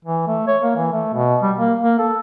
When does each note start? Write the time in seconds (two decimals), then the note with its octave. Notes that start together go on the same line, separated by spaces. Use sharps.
0.05 E3
0.27 A3
0.48 C#5
0.62 A#3
0.76 E3
0.93 A3
1.14 B2
1.42 G3
1.58 A#3
1.82 A#3
1.99 A4